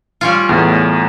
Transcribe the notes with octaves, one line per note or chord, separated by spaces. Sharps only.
G3 C#4 F4
E2 A2